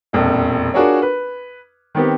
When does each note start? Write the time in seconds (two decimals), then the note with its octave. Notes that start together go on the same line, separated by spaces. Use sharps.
0.13 E1 A#1 F2
0.74 D4 F4 F#4 G#4 A#4 C#5
1.02 B4
1.95 D#3 B3 C4 G4